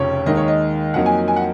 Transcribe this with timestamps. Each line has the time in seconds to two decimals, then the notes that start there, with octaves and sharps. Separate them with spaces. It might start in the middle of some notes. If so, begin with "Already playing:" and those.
Already playing: F1 F2 C#3 F3 C#5
0.26 D#2 D#3 G#3 D#4 D#5
0.37 C#5
0.48 D#5
0.94 F2 D#3 F#3 A#3 D#4 F#5
1.06 G#5
1.28 G#5
1.36 F#5